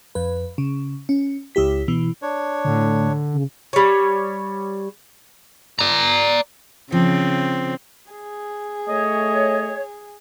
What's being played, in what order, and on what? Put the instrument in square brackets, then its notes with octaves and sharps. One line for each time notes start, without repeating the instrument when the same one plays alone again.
[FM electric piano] F2 B4
C#3
C#4
C#2 E4 G4 B6
B2 E3
[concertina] D4 C#5
[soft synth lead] A2 [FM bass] D3
[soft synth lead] C#3
[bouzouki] G3 C#5
[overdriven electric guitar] D5 A#5
[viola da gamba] C#3 [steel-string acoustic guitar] F3 [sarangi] C4
[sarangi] G#4
[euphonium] A3 [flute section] C#5 [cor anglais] D#5